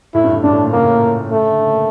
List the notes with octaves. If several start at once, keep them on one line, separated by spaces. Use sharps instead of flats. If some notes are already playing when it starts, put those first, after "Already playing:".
A2 E4
G2
A2
G2 D4
A2
A#2
C#3 A#3
A2
A#2
C#3 A3
D3
C#3
A#3